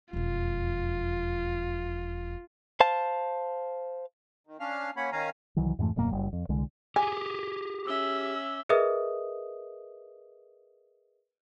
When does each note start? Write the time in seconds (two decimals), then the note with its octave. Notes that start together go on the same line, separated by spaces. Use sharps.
0.13 E1 F2 F4
2.80 C5 F5 A5
4.47 D#3
4.60 C#4 D4 F5 F6
4.97 A#3 C#4 C#5 F#5 B5
5.12 D#3 C#4 F5 G#5 A#5
5.56 C2 D#3 E3 F#3
5.79 F2 G#2 E3 A3
5.96 D#1 F#2 B2 A#3
6.11 F#1 G3
6.33 F2
6.49 C2 D3 G#3
6.96 G4 G#4 G#5
7.86 C#4 E5 D6 E6 G7
8.69 G#4 A#4 B4 D#5 E5 D#6